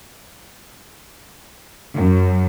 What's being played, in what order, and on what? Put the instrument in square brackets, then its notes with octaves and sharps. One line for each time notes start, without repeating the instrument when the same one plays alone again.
[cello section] F#2